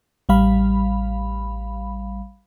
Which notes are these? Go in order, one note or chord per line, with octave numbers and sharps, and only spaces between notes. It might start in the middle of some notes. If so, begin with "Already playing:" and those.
A1 G3 F5 B5